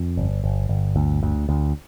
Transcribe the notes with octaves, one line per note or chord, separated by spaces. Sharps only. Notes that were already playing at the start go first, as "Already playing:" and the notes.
Already playing: F2
G1
G1
G1
D2
D2
D2